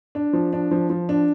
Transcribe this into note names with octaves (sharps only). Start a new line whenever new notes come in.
D4
F3
D4
F3
F3
D4